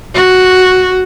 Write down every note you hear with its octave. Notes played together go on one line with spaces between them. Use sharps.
F#4